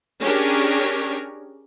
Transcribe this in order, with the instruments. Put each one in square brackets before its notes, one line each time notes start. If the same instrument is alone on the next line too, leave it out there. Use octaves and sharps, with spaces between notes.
[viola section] C#4 D4 G4 G#4 A#4 C#5